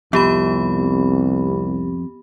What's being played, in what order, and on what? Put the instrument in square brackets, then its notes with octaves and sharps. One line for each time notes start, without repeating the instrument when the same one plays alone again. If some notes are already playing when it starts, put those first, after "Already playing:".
[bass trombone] C2 [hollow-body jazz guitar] F2 [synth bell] B3 G4 B5